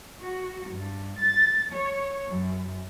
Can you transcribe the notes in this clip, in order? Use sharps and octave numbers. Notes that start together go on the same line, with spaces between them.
F#4
G2
A6
C#5
F#2